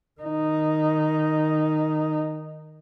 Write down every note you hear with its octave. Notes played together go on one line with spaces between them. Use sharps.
D#3 D#4